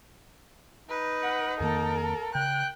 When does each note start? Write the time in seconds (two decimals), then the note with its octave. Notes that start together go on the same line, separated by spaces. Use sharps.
0.89 D#4 B4
1.22 F#5
1.60 F2 D#3 A#3 A4 A#4
2.35 C#3 G5 F#6